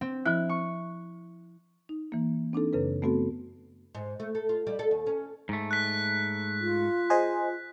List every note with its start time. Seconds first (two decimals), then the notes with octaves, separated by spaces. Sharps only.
0.01 C4
0.26 F3 E4 F#6
0.49 C#6
1.89 D#4
2.12 E3 A#3
2.53 C4 D4 D#4 A4
2.73 F#2 C#3 A4 B4
3.02 A3 B3 C4 F#4 A4
3.95 G#2
4.20 A3
4.35 A4
4.49 F4
4.67 G3
4.79 A4
4.91 D#2
5.07 C#4
5.49 G#2 A3
5.71 F#6 B6
6.61 F4
7.10 G#4 C5 D#5